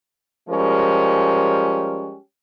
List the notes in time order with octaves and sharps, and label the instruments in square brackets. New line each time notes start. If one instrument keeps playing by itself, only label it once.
[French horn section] F3 G3 G#3 C#4 G4 A#4